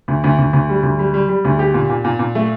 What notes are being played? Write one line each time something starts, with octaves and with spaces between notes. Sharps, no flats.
D2
D2
D2
D2
G3
D2
G3
G3
G3
D2
G4
A#2
A#2
A#2
A#2
A3